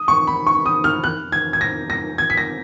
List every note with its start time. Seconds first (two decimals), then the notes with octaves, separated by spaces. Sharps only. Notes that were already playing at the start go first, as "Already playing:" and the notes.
Already playing: D#6
0.08 C#6
0.27 B5
0.47 C#6
0.66 D#6
0.84 F6
1.04 F#6
1.32 G#6
1.53 G#6
1.61 A#6
1.90 A#6
2.18 G#6
2.30 B6
2.37 A#6